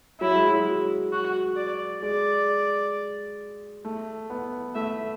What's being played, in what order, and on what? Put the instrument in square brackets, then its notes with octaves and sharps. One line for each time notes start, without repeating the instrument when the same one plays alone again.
[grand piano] F#3 [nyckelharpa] E4
[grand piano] G#3
F#3
[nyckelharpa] F#4
D5
[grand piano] G#3 [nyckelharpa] D5
[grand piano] A3
B3
[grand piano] A3 [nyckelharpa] E5